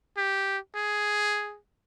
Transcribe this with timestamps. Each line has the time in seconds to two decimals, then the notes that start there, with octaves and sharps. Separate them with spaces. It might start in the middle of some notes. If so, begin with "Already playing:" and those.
0.17 G4
0.75 G#4